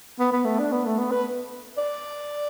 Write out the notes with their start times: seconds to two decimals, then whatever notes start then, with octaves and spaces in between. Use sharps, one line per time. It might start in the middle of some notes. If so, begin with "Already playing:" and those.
0.19 B3
0.32 B3
0.45 A3
0.59 D4
0.72 B3
0.86 A3
0.98 B3
1.11 B4
1.78 D5